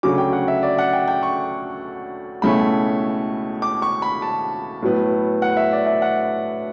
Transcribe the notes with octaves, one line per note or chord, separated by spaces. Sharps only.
D2 C#3 F#3 C#4 D6
G5
F#5
E5
D5
F#5
G5
G5
C#6
C#2 B2 A3 C#4 E4 B5
D6
C#6
B5
A5
A2 F#3 B3
F#5
E5
D5
E5
F#5